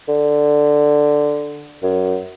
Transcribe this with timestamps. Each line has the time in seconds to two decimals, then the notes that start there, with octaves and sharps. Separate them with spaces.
0.08 D3
1.82 F#2